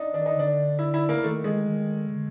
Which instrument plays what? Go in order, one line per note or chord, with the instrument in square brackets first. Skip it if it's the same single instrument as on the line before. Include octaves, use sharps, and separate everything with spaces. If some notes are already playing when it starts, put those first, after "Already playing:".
Already playing: [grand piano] D4 D#4
[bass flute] D#3 [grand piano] D4
[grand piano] D#4
[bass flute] D3 [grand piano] D4
[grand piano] E4
E4
A#3
[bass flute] D#3 [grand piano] A3
[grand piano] G#3
[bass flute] D#3
D3